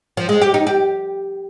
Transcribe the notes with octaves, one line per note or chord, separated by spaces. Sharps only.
F3
G#3
G4
D#4
G4